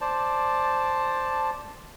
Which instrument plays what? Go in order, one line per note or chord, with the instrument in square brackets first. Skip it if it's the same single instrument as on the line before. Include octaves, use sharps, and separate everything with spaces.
[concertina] C5 D5 A5